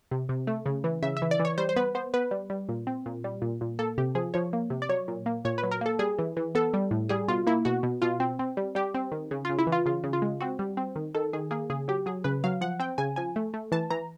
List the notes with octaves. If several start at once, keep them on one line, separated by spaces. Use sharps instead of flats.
C3
C3
A3
C#3
E3
C#3 E5
E5
E3
D5
E3
C#5
G3 C5
C5
B3 B4
B3 C5
B3 B4
G3
G3
A#2
C4
A#2
G3
A#2
A#2
A#3 A4
C3 G4
F3 G#4
F3 C#5
A#3
C3
D5
F#3 C#5
A#2
A#3
A#2 C#5
B4
F#3
A#4
A#3 A4
G3 G#4
E3
E3
B3 A4
G3
A2
G3 G#4
B2 F4
A#3 E4
B2 F#4
B2
B2 F4
C4
C4
G3
G3 G4
C4
D#3
C#3
C#3 F4
E4
E3
F4
C#3 F4
C#3
F4
G#3
C4 F#4
G3
C4
D#3
D#3 A4
D#3 G#4
A#3 G#4
C#3 G#4
F#3 G4
F#3 G#4
C#3 B4
F#3 F5
F3 F#5
C4 G5
C#3 G#5
F3 G#5
A3
A3
E3 A5
E3 A#5